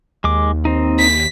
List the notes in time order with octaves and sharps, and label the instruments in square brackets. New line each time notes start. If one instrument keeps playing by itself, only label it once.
[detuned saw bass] D#2 [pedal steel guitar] G#3 D6
[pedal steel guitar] C4 D#4
[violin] B6